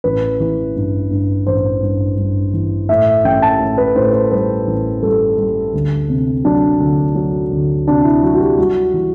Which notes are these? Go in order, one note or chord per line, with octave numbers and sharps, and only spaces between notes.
A1 B4
E3
G2
G2
A1 C5
G2
G2
E3
A2 E5
A1 G5
A5
A2
B4
A2 C5
C5
G3 B4
A1
G3 A4
G3
D2
C3
F#3 D4
D2
F#3
D2
C3 D4
E4
F#3 F#4
F#4
G4
G3 F#4
E3